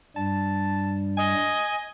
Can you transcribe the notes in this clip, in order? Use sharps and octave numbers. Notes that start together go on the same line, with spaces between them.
G2 G3 A5
D#5 G#5